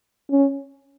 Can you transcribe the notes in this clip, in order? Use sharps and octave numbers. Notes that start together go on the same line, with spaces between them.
C#4